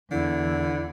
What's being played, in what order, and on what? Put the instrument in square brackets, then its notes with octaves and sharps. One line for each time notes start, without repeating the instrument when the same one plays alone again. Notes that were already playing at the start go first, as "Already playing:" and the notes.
[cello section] E2 [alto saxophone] D3 [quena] E4